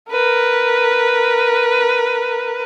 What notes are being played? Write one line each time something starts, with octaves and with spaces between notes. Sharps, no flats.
A#4 B4